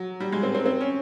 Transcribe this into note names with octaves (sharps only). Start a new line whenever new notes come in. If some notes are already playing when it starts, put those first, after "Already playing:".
Already playing: F#3
G3
G#3
C4
C4
C4
C#4